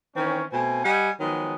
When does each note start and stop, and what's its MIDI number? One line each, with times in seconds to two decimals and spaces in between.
0.15 0.43 51
0.15 0.43 52
0.15 0.43 60
0.15 0.43 61
0.52 0.83 47
0.52 0.83 57
0.52 0.83 60
0.52 0.83 80
0.85 1.10 55
0.85 1.10 75
0.85 1.10 78
0.85 1.10 80
1.20 1.55 51
1.20 1.55 53
1.20 1.55 54
1.20 1.55 56
1.20 1.55 59